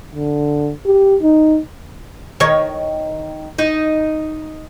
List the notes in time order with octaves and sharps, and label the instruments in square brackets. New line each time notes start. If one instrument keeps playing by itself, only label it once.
[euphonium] D3
G4
D#4
[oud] D#3 C#5
D#4